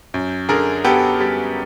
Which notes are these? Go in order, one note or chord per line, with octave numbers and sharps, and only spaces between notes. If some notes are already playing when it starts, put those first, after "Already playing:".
F#2
D3 G#4 A#4
B3 G4 A4
G3